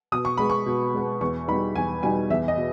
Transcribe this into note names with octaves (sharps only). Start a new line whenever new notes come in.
B2 D#6
C#6
G#3 B3 B5
C#6
B2
G#3 B3
E2 C#6
B2 G3 B3 D#4 B5
E2 G#5
B2 G3 B3 D#4 G#5
E2 E5
D#5
B2